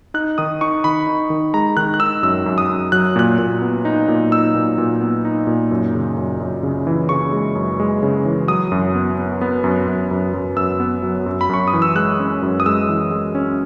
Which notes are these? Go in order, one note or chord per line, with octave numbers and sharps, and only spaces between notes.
D#4 F#6
D#3 D#6
D#4 C#6
D#3 B5
D#4
D#3
G#3 A#5
D#3 F#6
F#6
D#4 E6
F#2 E6
F#2
D#6
F#2
F#3 F#6
A#2 F#6
A#2
B3
D#4
A#2
D#4 E6
A#2
A#2
B3
D#4
A#2
F#2
C#3
F#2
F#2
C#3
E3
C#3 C#6
G#3
F#2
G#3
C#3
E3
F#3 D#6
F#2
B3
B3
B3
F#2
F#2
F#2
F#2
F#2 E6
B3
F#3
F#2
B5
F#2 C#6
D#6
E3
E6
G#3 F#6
C#4
F#2
D#6
G#3 E6
E3
G#3
C#4